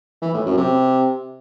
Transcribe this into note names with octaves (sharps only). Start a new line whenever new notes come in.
E3
A2
F#2
C3